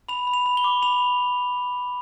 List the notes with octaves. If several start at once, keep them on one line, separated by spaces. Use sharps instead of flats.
B5 F7
B5
F7
B5
G7
D6
B5 F7